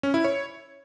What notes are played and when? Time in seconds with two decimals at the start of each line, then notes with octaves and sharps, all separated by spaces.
0.03 C#4
0.14 E4
0.24 C#5